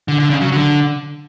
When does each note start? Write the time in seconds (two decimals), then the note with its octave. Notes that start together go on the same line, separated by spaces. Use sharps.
0.08 D3
0.19 D3
0.30 C#3
0.41 F#3
0.52 D3